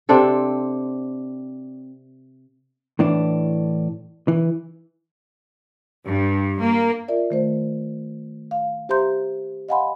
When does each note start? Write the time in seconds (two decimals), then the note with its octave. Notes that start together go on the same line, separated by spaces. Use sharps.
0.09 C3 C4 D4 A4
2.99 A2 E3 D4
4.28 E3
6.04 G2
6.58 A#3
7.08 F4 A#4 D5 E5
7.30 D#3 A3 C5
8.51 F5
8.89 G4 C5 E5 A#5 C6 G6
9.69 D#5 F5 F#5 G#5 B5 C6